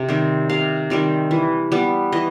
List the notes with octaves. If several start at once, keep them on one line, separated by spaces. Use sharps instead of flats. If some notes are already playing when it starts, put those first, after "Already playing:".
Already playing: C3
D#3 G3 C4
C3 F5
D#3 G3 C4
E3
G3 B3
E3 D#5